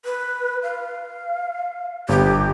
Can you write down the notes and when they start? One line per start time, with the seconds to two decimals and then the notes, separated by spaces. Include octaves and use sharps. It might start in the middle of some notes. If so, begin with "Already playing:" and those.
0.05 B4
0.63 F5
2.09 G1 G4